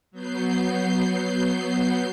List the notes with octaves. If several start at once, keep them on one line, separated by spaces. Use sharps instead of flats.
F#3 B3 G6 C7